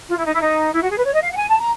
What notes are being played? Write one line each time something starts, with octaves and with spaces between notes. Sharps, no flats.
F4
E4
D#4
E4
D#4
E4
F#4
G#4
B4
C#5
D#5
F5
F#5
G#5
A5
A#5